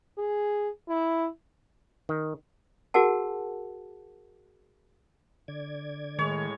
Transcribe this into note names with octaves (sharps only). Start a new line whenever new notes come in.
G#4
E4
D#3
F#4 G#4 A#4 F#5 A5
D3 D5 G#6
A2 D#3 G#3 C#5